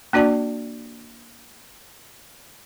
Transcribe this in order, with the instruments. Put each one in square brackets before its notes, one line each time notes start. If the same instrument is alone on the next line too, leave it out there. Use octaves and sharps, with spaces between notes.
[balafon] A#3 D4 F#4 D5 A5